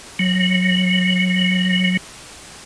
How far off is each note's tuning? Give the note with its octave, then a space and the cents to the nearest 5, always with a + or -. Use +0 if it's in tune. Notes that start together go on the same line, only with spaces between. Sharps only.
F#3 -15